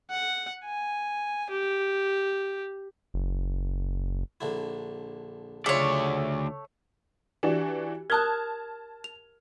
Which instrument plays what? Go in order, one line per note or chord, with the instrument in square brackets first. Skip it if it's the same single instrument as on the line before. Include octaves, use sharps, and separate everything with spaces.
[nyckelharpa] F#5
G#5
G4
[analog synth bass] F#1
[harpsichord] A#1 D3 E4
[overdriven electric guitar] D2 D5 [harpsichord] C#3 F#3 F4 [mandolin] A3 C#5
[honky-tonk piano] E3 D4 F#4 [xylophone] G4
[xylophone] A#4 D#6 F#6 [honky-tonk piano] A5 F6 G#6
[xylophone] F7